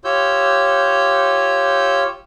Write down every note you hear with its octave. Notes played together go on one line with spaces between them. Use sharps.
F4 G4 C#5 E6 G6